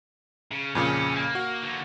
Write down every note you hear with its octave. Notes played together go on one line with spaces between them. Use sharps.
C#3
F2 A#2 C#3 C#4
A#3
F#4
D3 A#3